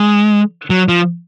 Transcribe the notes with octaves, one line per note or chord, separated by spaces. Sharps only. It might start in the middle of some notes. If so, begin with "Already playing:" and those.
Already playing: G#3
F#3
F3